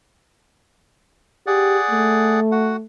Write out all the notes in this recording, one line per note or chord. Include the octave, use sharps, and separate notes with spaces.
G4 G#4 D5 F#5
A3
F#4 F#5